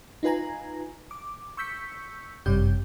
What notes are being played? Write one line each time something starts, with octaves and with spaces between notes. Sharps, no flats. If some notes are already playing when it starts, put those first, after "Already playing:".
D#4 F4 B4 G#5 A#5
D6
C#6 E6 G6 B6 C#7
G1 F#2 C3 G3 G4 G6